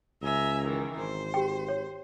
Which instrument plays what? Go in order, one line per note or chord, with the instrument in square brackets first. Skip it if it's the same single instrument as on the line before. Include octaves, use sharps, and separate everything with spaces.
[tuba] C#2 [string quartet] E5 G#5 A#5
[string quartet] D#3 E3
[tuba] G#1 [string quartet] C5
[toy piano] G4 G5
C#5